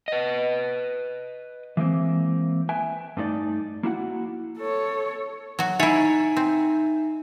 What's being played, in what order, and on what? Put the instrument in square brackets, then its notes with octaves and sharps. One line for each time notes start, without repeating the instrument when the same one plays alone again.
[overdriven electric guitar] B4 D#5
[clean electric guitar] E3 G#3 A#3 C4
B4 E5 G5 G#5
G2 A3 D#4 B4 D5
A#3 E4 F#4 F#5
[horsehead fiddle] A4 C#5
[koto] F#3 F#4
[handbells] D#4 E5 G#5 [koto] E4 C#5
[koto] C4